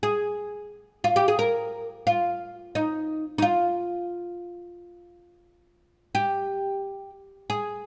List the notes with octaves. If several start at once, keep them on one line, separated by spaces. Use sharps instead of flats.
G#4
F4
G4
G#4
A#4
F4
D#4
D#4
F4
G4
G#4